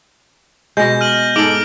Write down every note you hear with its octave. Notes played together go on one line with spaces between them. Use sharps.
B2 G#3 G6 A#6
F6 D#7 F#7
G#2 A4 D6 D7 F#7